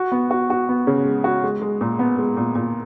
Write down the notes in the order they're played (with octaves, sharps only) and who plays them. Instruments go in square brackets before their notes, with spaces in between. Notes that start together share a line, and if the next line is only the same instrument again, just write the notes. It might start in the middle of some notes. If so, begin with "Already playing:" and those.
Already playing: [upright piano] F#4
B3
F#4
F#4
B3
C#3
G#3
F#4
G#3
G#3
A#2
B3
G#3
A#2
A#2